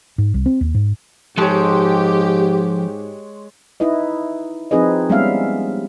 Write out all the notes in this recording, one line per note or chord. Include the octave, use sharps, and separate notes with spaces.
G#2
C2
C4
D#2
G#2
G#2 F3 G#3 G4 A4 C#5 A5
D#4 E4 B4 D#5
F3 C4 D#4 G#4 B4 D#5
G3 G#3 B3 C#4 E5 F5